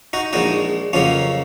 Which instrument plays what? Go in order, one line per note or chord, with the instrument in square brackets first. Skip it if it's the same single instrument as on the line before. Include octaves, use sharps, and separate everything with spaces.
[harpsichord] D#4 F#4
A#1 A#2 G#3 D#4 F#4
F2 C#3 F#3 A#3 C#4 F4